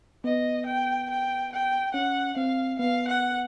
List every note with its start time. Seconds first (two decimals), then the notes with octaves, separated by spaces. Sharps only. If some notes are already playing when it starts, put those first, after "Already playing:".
0.24 B3 D#5
0.66 G5
1.10 G5
1.52 G5
1.94 C#4 F#5
2.36 C4 F5
2.79 B3 F5
3.08 F#5